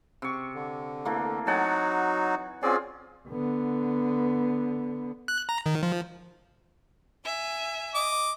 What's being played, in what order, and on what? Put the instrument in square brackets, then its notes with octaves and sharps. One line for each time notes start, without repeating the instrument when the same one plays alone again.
[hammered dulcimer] C3 C#6
[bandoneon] D3
[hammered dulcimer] E3 A3 A#3
[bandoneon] F#3 D#4 F#4 [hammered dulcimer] F#5 G#5 A5
[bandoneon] C4 C#4 D5 [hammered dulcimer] F4 G#4
[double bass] D3 B3
[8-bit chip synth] F#6
A#5
D#3
F3
[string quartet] E5 G#5
[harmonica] D#5 D6